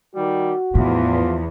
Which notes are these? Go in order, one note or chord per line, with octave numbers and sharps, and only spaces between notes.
D#3 G3 F#4
E2 A2 F3 F4